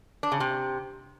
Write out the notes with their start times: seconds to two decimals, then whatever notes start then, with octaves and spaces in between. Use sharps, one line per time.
0.23 D4
0.32 C#3
0.40 C3